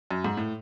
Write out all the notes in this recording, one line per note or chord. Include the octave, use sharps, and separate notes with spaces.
F#2
G#2
A2